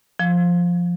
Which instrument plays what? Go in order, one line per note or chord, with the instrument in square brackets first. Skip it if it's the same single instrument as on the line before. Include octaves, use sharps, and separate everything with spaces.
[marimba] F3